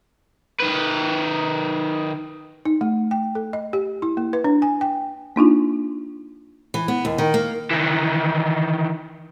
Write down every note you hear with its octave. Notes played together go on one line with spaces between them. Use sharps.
D#3 B4
D#4
A3
G5
A4
D#5
G4
E4
A#3
B4
D4
G#5
G5
A#3 D4 D#4 F4
E3
B3
D#2
D#3
A#3
D#3 E3